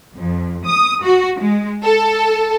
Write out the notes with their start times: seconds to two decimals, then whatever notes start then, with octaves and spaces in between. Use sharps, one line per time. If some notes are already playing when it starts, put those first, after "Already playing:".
0.15 F2
0.65 D#6
1.03 F#4
1.40 G#3
1.83 A4